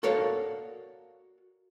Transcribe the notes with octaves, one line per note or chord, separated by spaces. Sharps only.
F#4 A4 A#4 C#5 D5 F5